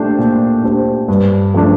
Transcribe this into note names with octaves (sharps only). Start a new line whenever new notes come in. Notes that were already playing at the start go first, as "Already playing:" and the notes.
Already playing: A#2 A3 D4 G4 C5
A#2
A3 D4 G4 C5
G2
F3 A3 D4